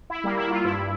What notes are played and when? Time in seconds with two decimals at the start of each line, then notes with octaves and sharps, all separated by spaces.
0.10 E4
0.24 G3 A#3
0.37 E4
0.50 F4
0.64 G2 E4